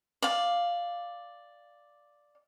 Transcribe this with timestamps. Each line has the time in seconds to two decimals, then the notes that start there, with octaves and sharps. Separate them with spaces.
0.22 D5 F5